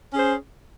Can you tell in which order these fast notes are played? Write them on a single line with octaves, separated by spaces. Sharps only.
C#4 G#4 C5